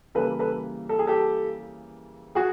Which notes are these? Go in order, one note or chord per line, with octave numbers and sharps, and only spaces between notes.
C#3 E3 G3 A#3 A4 B4
A4 B4
A4
G#4
G4 A4
F#4 G#4